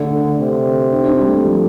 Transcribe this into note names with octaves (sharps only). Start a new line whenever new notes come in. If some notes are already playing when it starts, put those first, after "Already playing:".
Already playing: D3 A3
C3
D4
D4
C4
G3
A3
F3